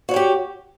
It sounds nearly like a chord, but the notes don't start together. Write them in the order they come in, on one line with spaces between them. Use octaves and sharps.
F#4 C#5 G5 G4